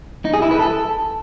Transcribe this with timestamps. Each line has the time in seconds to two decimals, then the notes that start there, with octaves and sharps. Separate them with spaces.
0.25 D#4
0.34 G#4
0.42 E4
0.51 B4
0.60 A4